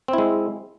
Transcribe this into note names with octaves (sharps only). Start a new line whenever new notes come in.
G#3 C4 E4